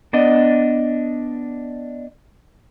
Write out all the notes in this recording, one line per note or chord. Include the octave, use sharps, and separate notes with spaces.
B3 D4 D5 D#5